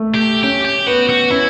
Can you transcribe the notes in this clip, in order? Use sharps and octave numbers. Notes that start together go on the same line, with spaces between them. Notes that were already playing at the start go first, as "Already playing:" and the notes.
Already playing: A3
G4
C#4 G4
G4
B3 F#4
F#4
C#4 E4